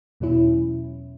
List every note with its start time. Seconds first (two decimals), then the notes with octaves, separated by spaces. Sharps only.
0.20 E2 B2 F#3 C#4 E4